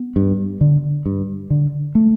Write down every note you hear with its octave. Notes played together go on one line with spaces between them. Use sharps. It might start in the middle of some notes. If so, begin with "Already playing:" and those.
Already playing: B3
G2
D3
G2
D3
A3